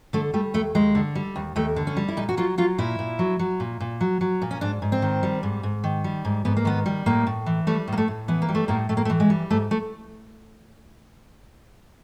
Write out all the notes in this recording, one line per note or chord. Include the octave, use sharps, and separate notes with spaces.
D3 A3
G3 A3
D#2 A3
D#2 G#3
D3
G3
D#2
D#2 A3
D3
C#4
G3
E4
A#2 D#4
F#4
F#3 F4
F#3 F4
A#2 E4
A#2
F#3
F#3
A#2
A#2
F#3
F#3
A#2
C#4
G#2 D4
G#2
C4
D#3
G3
G#2
G#2
D#3
G3
G#2
G#2 B3
A#3
D#3 B3
G3
A2 A#3
A2
E3
G3 A3
A2 A#3
A3
A2
E3 B3
A#3
G3
A3
A2 A#3
A2 A3
A#3
A3
E3
G#3
G3
G#2 A3
A3